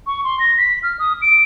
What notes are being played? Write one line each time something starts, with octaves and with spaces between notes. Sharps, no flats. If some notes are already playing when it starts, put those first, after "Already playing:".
C#6
C6
A#6
B6
F6
D#6
D7